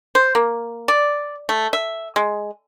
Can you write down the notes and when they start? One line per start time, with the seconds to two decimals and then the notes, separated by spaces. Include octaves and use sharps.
0.15 C5
0.35 A#3
0.88 D5
1.49 A3
1.73 E5
2.16 G#3